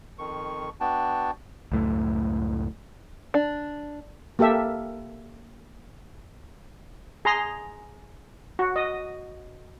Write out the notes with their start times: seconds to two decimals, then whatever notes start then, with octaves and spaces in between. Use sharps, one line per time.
0.19 F2 D#3 C#6
0.80 B3 D4 F#4 G5 A5
1.72 C#2 F#2 A2 A3
3.34 D4
4.39 A#3 G4 A4 E5
7.25 G#4 A#5 C6
8.59 F#4
8.76 D#5